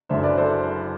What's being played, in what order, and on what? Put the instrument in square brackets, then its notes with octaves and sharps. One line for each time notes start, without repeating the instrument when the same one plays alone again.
[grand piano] F#1 F#2 D3 C5 E5
B4 D5
A4 C5